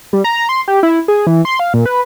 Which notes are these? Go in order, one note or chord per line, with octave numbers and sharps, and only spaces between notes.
G3
A#5
C6
G4
E4
G#4
E3
C6
F5
A#2
B4